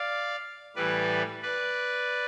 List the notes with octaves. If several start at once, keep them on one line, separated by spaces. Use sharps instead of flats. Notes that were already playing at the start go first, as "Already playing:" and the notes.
Already playing: D5 F5
A2 E3 G3 B4 D5
B4 D5